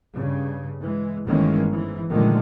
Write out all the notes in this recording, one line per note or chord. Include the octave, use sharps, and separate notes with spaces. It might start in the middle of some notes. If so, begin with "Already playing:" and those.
G2 C#3
E3 G#3
G1 D#3 E3 G#3 A#3 C#4
G#2 E3
A#2 D3 D#3 F3 G#3 A3